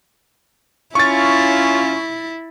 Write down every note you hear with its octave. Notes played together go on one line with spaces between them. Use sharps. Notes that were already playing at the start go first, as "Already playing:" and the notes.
C#4 E4 F4 C#6 A6